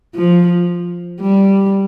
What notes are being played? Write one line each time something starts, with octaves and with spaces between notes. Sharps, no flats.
F3
G3